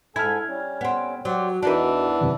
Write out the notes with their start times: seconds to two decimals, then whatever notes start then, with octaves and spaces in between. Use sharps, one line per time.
0.16 G#2 E4 A4 G#5 F6 G#6
0.48 G3 C#4
0.81 B3 C4
1.25 F#3 G4 C5 D5
1.63 E2 E3 D4 D#4 F#4 A#4 B4 A5
2.21 F#2 C3 D#3